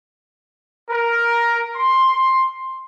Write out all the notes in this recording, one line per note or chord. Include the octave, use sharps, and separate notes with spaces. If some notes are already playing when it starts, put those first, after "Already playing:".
A#4
C6